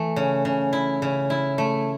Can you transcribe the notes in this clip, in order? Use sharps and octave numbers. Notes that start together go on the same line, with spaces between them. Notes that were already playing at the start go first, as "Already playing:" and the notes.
Already playing: E3 A3
C#3
C#3
E4
C#3
E4
A3